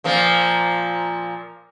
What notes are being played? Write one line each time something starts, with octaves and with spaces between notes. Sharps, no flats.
A#2 F3 A#3